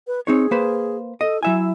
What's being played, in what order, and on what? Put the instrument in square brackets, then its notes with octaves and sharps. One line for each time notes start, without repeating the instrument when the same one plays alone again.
[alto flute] B4
[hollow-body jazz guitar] C4 D#4 C#5 [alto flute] G#4
[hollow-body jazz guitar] A#3 B4 C5
[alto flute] A4 [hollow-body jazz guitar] D#5
[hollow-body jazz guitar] F#3 E5 G#5 [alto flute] E4